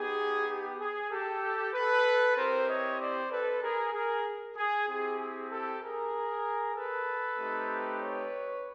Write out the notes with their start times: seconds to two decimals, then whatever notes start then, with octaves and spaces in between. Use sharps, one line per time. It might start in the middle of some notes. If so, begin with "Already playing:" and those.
Already playing: B3 D#4 G4 G#4
0.48 G4
0.79 G#4
1.11 G4 A4
1.73 A4 B4
2.36 C4 E4 G4 A#4 C5
2.67 C#5 D#5
2.99 C5 D5
3.31 A4 B4
3.62 G#4 A#4
3.93 G#4 A#4
4.56 G#4
4.87 C4 E4 G4 G#4
5.19 G#4
5.50 G4 A4
5.81 G#4 A#4
6.75 A4 B4
7.38 A3 C4 D#4 G4
8.01 B4 C#5